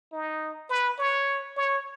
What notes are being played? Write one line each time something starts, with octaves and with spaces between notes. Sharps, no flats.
D#4
B4
C#5
C#5